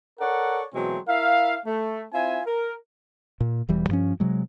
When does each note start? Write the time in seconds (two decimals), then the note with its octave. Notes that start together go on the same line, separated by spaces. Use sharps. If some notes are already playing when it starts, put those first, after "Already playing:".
0.20 A4 A#4 C#5 D5 F#5
0.74 B2 E3 F#3 G#3 A3 C4
1.08 E4 A#4 E5 F5
1.66 A3
2.13 C4 E4 F4 E5 G#5
2.46 A#4
3.41 A#2
3.69 E1 E3 G3
3.89 G2 F3 C#4
4.20 C3 F#3 G#3